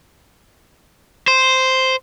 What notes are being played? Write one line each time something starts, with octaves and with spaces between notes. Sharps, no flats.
C5